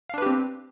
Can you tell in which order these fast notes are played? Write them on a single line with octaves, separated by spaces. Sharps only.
F5 D4 B4 G4 C4